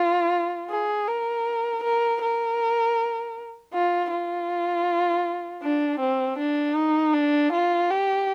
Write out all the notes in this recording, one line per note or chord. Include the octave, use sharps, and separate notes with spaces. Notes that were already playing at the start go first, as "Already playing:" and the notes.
Already playing: F4
G#4
A#4
A#4
A#4
F4
F4
D4
C4
D4
D#4
D4
F4
G4